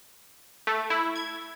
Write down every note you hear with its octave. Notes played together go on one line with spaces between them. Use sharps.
A3
E4
G#6